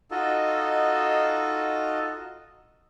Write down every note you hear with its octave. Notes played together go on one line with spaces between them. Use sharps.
D#4 F4 F#4 A4 D#5